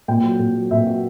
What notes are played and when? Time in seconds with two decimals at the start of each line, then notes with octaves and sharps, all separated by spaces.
0.08 A#2 G5
0.24 F#3
0.39 A#2
0.55 F#3
0.71 A#2 E5
0.87 F#3 F#4